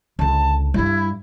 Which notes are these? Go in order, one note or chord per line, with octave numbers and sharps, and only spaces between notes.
C#2 D3 A5
G2 G3 E4